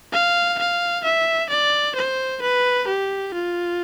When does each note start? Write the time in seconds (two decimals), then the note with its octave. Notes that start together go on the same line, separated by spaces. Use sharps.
0.13 F5
0.59 F5
1.04 E5
1.50 D5
1.95 C5
2.42 B4
2.87 G4
3.34 F4